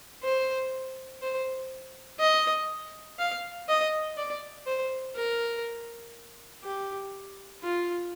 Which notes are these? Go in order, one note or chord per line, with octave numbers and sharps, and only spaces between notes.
C5
C5
D#5
F5
D#5
D5
C5
A#4
G4
F4